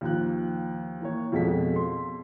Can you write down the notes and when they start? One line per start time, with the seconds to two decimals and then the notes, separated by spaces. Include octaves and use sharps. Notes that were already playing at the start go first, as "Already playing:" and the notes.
0.01 D#2 F3 F#6
1.01 E3 A#3 C#5
1.32 F2 B2 G#3 F4 A4 B6
1.76 C6